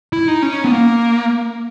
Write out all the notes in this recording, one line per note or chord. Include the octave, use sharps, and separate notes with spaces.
E4
D#4
C#4
B3
A#3